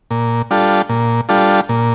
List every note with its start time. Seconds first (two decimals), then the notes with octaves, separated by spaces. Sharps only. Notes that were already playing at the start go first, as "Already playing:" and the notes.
0.11 A#2
0.51 G3 D4 F4 A4
0.89 A#2
1.29 G3 D4 F4 A4
1.69 A#2